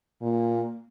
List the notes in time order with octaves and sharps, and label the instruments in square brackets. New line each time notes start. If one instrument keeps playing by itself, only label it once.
[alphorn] A#2 [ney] A#3